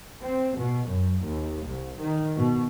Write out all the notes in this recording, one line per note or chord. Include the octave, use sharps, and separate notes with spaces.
C4
B2
F#2
D#2
C2
D#3
B2